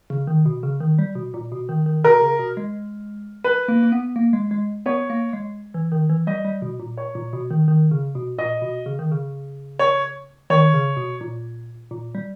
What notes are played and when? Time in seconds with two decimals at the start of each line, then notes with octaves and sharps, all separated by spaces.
0.10 C#3
0.27 D#3
0.46 B2
0.63 C#3
0.80 D#3
0.99 G3
1.15 B2
1.34 A#2
1.52 B2
1.69 D#3
1.86 D#3
2.04 B2 A#4
2.21 C#3
2.39 B2
2.57 G#3
3.44 B4
3.68 A#3
3.83 A#3
3.92 B3
4.16 A#3
4.33 G#3
4.51 G#3
4.86 B3 C#5
5.10 A#3
5.33 G#3
5.74 E3
5.92 D#3
6.10 E3
6.27 G3 D#5
6.45 G3
6.62 B2
6.80 A#2
6.97 C#5
7.15 A#2
7.33 B2
7.50 D#3
7.68 D#3
7.91 C#3
8.15 B2
8.38 A#2 D#5
8.62 B2
8.86 C#3
8.99 D#3
9.12 C#3
9.79 C#5
10.50 D#3 C#5
10.74 C#3
10.97 B2
11.21 A#2
11.91 A#2
12.15 G3